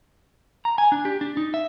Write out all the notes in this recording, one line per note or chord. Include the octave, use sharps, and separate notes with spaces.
A#5
G#5
D4
G4
D4
D#4
E5